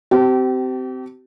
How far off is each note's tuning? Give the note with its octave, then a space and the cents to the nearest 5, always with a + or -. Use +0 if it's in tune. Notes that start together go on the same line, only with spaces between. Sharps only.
C4 -20 G4 -35 A5 +15